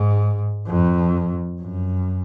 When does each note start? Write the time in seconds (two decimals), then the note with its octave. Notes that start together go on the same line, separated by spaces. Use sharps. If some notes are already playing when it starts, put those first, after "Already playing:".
Already playing: G#2
0.67 F2
1.61 F#2